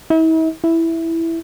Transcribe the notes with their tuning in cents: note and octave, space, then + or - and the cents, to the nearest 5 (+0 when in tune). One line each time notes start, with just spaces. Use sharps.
E4 -45
E4 +0